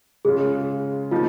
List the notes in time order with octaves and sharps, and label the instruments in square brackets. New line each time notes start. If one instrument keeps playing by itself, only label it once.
[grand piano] C#3 G#3 C#4 F4 [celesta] G#4
[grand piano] F3 A#3 D#4 [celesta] F4